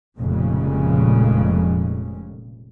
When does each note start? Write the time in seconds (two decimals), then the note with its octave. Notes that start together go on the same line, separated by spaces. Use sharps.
0.18 F1 F2 A#2 C#3 G#3